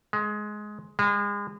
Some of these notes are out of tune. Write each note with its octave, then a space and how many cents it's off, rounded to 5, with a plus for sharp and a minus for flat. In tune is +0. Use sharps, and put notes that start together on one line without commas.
G#3 +15
G#3 -35